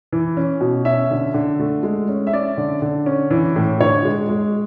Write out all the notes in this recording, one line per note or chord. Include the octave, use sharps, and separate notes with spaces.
E3
C#4
B2
C#4 E5
D3
D3
A3
G#3
C#4
E5
C#4 D5
D3
D3
C#4
E3
A2
D3 C#5
G#3
G#3